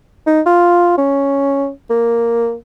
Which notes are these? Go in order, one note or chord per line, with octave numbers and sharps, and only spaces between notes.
D#4
F4
C#4
A#3